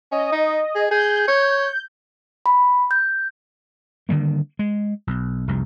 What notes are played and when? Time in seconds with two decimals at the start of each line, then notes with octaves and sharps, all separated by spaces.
0.12 C#4 D#5
0.32 D#4
0.75 G#4
0.91 G#4 G6
1.28 C#5
2.46 B5
2.91 G6
4.09 D3 D#3 G3 A#3
4.59 G#3
5.07 B1
5.47 F1 C2